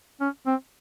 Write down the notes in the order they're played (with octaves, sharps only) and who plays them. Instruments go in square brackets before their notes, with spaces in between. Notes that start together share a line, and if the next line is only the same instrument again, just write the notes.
[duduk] C#4
C4